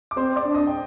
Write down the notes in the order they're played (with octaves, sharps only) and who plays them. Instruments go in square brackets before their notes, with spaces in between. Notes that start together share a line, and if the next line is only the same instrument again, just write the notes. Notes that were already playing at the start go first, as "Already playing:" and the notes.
[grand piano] D6
[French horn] C4 [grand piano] C5 C6
[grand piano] D5 D6
[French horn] D4
[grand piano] D#5 D#6
G5